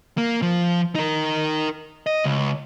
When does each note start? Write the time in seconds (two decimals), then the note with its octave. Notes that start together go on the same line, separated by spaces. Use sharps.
0.18 A#3
0.42 F3
0.95 D#4 A#4
2.07 D#5
2.24 C#2